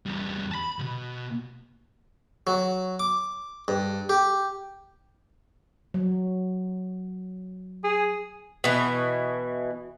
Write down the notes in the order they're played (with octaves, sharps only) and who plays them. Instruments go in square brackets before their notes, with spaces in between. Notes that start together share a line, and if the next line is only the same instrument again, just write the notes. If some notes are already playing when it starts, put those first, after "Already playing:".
[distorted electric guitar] E2 G3
A5 B5
C2 B2
[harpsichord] F#3
D6
G2
G4
[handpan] F#3
[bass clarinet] G#4
[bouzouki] B2 E3